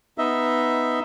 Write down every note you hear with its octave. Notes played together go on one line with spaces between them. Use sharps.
B3 D#4 D#5 E5